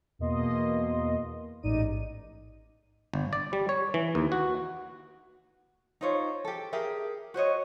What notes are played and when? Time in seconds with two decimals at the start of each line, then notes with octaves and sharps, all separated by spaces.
0.19 E2 B2 A#3 D#5 C6
1.63 A1 G#2 D#4 D5 D#7
3.14 G1
3.33 D5
3.53 G3
3.69 C#5
3.94 E3
4.15 D#2
4.32 F#4
6.01 D#4 F4 C5 C#5
6.45 G4 A4
6.73 G4 G#4 A#4 E5
7.34 F#4 C5 C#5 D#5